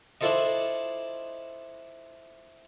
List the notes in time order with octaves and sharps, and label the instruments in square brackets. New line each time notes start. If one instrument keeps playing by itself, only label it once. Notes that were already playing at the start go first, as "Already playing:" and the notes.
[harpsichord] D4 E4 F4 A4 C5 D#5